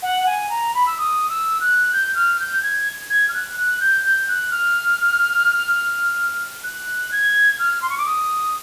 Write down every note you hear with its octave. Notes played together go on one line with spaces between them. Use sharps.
F#5
G#5
A#5
B5
E6
D#6
E6
F#6
G6
F6
G6
G#6
G#6
F6
F#6
F#6
G6
G6
F#6
F6
F#6
G#6
F6
C6
C#6
D6
D#6